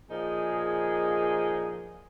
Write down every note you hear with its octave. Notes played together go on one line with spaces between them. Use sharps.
A#2 F3 D#4 G#4